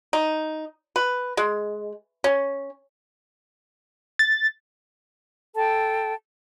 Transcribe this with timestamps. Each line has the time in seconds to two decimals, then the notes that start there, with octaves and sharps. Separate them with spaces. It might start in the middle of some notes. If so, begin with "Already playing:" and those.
0.13 D#4
0.96 B4
1.37 G#3
2.24 C#4
4.19 A6
5.56 A4 G5 A5